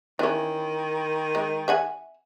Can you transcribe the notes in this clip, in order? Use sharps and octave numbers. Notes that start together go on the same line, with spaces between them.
D#3 E3 C#4
G#3
E5 F#5 G#5